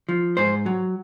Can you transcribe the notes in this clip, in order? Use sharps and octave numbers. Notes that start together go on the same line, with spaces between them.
F3
G#2 C5
F#3